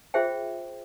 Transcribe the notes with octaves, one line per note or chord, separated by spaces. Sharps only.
F4 G#4 C5 E5 G5